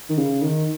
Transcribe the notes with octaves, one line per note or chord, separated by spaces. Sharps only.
D#3
C#3
D#3